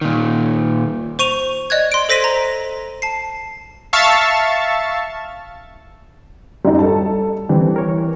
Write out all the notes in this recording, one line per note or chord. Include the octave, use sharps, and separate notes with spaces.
A#2 D#3
C5 C#6 D#7 F7
D5 D#5 F#6 G#6
C6 D7
A4 C5 A#6 B6 D#7
A#5
A5 C7
E5 F5 A5 C#6 A6
F#2 G3 D#4
A4 A5
E3 G3 C4
A#4 C#5